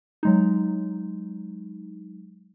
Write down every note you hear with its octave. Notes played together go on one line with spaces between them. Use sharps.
F#3 G#3 D#4